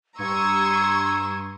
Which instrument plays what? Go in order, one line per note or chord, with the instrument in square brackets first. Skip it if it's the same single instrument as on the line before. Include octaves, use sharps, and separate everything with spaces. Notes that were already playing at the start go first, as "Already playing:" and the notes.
[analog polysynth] G2 [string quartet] A#5 E6 [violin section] C6 C#6 D#6 [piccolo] G#6